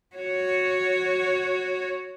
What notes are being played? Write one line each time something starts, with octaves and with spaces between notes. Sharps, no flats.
F#4 C#5